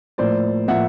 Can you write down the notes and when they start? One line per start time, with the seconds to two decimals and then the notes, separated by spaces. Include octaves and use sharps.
0.18 A2 F3 A#3 C5 D5
0.67 A2 F3 A#3 E5 F#5